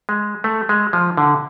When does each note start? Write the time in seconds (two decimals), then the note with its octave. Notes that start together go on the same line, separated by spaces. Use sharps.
0.09 G#3
0.44 A3
0.69 G#3
0.93 F3
1.17 D3